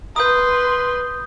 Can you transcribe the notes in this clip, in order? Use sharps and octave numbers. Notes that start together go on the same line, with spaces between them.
B4 C6 D#6 G6